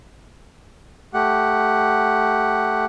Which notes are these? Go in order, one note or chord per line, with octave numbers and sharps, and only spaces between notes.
A3 G4 F#5